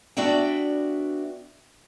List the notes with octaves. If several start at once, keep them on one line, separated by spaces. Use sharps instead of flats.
B3 D4 F#4 D5 E5 G5